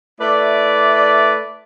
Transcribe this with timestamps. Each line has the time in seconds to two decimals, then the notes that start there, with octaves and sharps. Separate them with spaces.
0.19 A3 E4 B4 D5